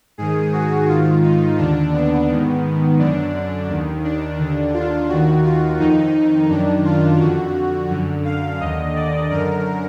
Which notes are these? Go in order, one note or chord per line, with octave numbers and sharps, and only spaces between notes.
G#2 D#3 G#4
F#4
G#2 D#3 F4
D#4
D#2 D3 D4
B3
G#2 D#3
F#2 D3 D4
D#2 D#3
D4
D#2 D3
F4
D#2 D#3 F#4
F4
F2 D#3 D#4
F#2 D#3 D4
F4
F2 D3 F#4
F#2 D3
F5
D#2 D3 D#5
D5
F#2 D3 A#4